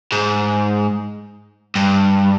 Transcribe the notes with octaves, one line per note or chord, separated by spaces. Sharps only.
G#2
G2